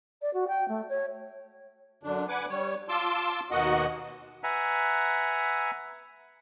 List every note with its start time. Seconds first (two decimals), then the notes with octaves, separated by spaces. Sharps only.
0.21 D5
0.33 F#4
0.47 G5
0.68 A3
0.88 C#5
2.03 F#2 D3 D4
2.28 B4 F#5 G#5 D6
2.49 G3 C#5
2.89 F4 A5 C6 D6 E6
3.51 D#2 B2 A#3 F#4 D#5 F#5
4.43 B4 E5 F#5 G#5 A#5